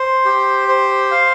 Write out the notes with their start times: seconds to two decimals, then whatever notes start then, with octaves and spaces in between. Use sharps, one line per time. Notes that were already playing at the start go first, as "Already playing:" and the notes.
Already playing: C5
0.25 G4
0.68 C5
1.11 F5